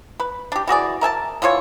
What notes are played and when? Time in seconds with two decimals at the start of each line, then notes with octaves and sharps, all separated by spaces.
0.20 B4
0.52 D4 G4
0.67 E3 F#4 G#4 D5
1.01 A#4 E5 G#5 A5
1.42 D3 E3 F4 C#5